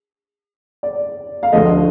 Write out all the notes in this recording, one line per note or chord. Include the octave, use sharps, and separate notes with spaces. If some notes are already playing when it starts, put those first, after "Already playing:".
D5
F5
D2 D3 F3 A3 D#5